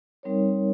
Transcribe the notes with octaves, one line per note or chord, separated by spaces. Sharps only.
G3 C4 D#4 A#4 C#5